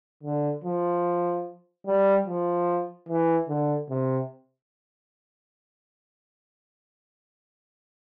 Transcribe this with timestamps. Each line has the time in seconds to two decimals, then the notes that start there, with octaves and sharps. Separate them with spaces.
0.23 D3
0.64 F3
1.87 G3
2.27 F3
3.08 E3
3.49 D3
3.90 C3